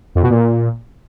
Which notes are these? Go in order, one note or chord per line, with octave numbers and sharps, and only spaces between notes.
F2
B2
A#2